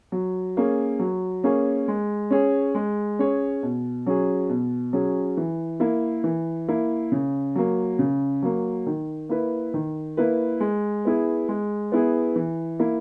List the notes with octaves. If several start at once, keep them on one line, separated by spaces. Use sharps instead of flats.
F#3
A#3 C#4 G#4 C#5
F#3
A#3 C#4 G#4 C#5
G#3
C#4 G#4 C#5
G#3
C#4 G#4 C#5
B2
F#3 C#4 G#4
B2
F#3 C#4 G#4
E3
A#3 E4
E3
A#3 E4
C#3
F#3 A#3
C#3
F#3 A#3
D#3
A#3 E4 B4
D#3
A#3 E4 B4
G#3
B3 E4 G#4
G#3
B3 E4 G#4
E3
A#3 E4